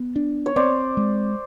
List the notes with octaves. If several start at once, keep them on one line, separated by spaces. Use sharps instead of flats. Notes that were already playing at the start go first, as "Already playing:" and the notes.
Already playing: B3
D4
C#5
C4 C5 D5
G#3